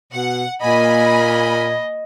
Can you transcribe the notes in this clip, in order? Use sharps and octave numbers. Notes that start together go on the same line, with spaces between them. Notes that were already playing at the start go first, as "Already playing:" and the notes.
B2 F#5
A#2 A#3 D#5 G#5 B5